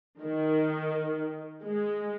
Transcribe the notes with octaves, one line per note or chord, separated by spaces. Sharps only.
D#3
G#3